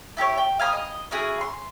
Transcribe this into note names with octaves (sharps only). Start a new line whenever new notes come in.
E4 G4 A4 C#5
G5
F5 G#5 A#5 D#6
D#5
C#4 E4 F#4 G#4
C6